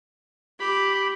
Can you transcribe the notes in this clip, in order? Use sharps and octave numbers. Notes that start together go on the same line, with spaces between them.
G4 B5